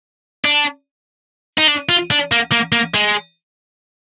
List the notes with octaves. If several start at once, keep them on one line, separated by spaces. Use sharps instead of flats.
D4
D#4
D4
F4
D4
A#3
A#3
A#3
G#3